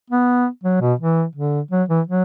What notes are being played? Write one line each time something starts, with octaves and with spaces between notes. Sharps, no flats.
B3
F#3
B2
E3
D3
F#3
E3
F#3